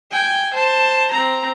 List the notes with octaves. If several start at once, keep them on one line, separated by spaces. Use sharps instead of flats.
G5 G#5
C5 A5
C4 A#5